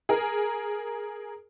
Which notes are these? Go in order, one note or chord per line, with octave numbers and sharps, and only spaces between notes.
G#4 A#4